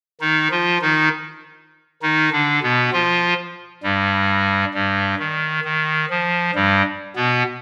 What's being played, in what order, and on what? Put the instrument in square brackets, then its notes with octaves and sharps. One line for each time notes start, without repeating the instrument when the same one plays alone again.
[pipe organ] D#3 D#4
F3 F4
D#3 D#4
D#3 D#4
D3 D4
B2 B3
F3 F4
G2 G3
G2 G3
D#3
D#3
F3
G2 G3
B2 B3